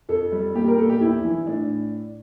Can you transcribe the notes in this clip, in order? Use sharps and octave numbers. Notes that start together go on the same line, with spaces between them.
F2 A4
G3
A#2 G4
A#4
A#2 A4
G4
E2 E4
E3
A2 D4